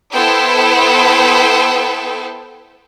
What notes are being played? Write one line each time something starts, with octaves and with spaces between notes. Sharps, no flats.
B3 E4 A4 C5 G5